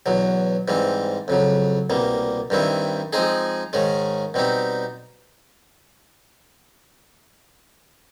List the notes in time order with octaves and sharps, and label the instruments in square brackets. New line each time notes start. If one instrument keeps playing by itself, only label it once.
[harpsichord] E2 B2 F#3
G#2 E3 G3 C4
F2 C#3 F#3
C2 B2 G3 A#3
G2 D#3 G3 C4 E4
F3 G#3 C4 D#4 G#4
G#2 D#3 G#3 C#4
B2 G3 C4 D#4 G4